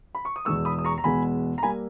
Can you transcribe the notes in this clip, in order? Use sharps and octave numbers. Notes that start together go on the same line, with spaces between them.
B5
C#6
D#6
E2 B2 G#3 B3 C#6 E6
B5 D#6
D#6
A#5 C#6
A#5
E2 B2 G#3 B3 G#5 B5
A#5
G3 A#3 G#5 B5